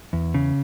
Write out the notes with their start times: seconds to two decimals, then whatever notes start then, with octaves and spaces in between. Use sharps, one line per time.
0.13 E2
0.34 C#3